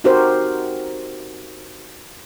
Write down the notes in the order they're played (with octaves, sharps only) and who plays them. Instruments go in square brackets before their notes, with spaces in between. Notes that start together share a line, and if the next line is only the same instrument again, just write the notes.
[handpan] C4 D#4 F#4 G4 A#4 C5